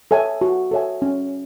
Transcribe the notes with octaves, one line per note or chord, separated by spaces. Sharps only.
A4 C#5 E5 G#5
F#4
A4 C#5 E5 G#5
C#4